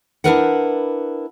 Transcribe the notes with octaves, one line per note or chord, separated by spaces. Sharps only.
D4 E4 F4 A#4 B4 F#5